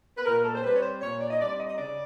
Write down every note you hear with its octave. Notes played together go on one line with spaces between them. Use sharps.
B4
A#2 A#4
A4
C5
G3 C4 B4
C#5
C5
A#2 C#5
D5
D#5
G3 C4 D5
D#5
D#5
C#3 D5